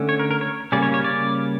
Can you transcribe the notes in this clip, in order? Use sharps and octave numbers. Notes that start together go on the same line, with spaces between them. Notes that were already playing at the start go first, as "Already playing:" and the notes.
Already playing: D3 A3 C#4
C#5
A#4
A#4
C#5
C#3 G3 A#3 C#4 D5
C#5
C#5
D5